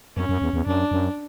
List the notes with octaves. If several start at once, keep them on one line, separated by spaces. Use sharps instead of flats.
F#2 C#4
F#2
E2
E2
F#2 D4
F#2